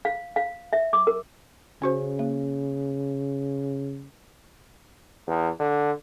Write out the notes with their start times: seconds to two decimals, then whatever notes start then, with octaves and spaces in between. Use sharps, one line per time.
0.05 F5
0.36 F5
0.73 E5
0.93 D6
1.07 A#4
1.82 C#3 C#4 F#4 C5
2.19 A#3
5.27 E2
5.60 D3